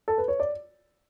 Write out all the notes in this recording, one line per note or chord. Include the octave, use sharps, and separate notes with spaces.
A4
B4
C#5
D5